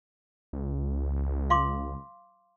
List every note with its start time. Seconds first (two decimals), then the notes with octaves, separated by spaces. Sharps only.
0.53 C#2
1.50 F5 C6 D6